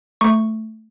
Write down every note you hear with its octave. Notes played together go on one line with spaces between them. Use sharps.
A3 C#6